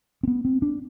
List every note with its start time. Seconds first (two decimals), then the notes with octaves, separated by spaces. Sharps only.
0.23 C4
0.27 B3
0.45 C4
0.62 D4